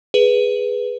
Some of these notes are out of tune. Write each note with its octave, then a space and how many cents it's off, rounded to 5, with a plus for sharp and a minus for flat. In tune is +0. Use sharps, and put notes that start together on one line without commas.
G#4 +0 B4 +0